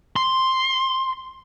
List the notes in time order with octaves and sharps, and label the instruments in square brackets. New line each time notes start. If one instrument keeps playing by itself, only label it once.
[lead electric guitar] C6